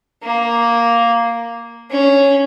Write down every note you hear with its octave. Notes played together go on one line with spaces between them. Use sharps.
A#3
C#4